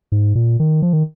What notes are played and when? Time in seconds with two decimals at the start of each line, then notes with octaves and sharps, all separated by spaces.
0.12 G#2
0.35 A#2
0.60 D#3
0.82 F3
0.93 D#3